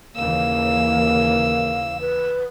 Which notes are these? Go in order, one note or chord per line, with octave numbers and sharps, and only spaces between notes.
D#2 C#3 E3 A#3 F5 E6
B4